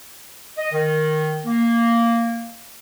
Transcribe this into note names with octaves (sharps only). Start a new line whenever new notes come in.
D#5
D#3
A#3